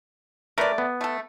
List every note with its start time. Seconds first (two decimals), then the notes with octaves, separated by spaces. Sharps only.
0.58 A3 A#4 B4 D5
0.78 B3
1.01 A3 A4